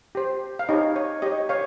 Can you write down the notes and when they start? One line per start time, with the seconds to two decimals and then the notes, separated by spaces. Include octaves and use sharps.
0.15 G4 C5
0.59 F5
0.69 D#4 G4 C#5 D#5
0.96 C#5
1.22 G4 C#5 D#5
1.49 C#5 F5